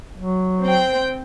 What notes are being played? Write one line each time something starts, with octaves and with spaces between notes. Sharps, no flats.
F#3
C4 G5